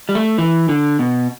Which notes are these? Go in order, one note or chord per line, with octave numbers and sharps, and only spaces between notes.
G3
A3
E3
D3
B2